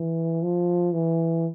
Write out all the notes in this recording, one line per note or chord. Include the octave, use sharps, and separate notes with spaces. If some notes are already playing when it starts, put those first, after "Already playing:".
Already playing: E3
F3
E3